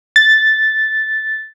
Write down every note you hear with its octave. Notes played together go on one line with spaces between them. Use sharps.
A6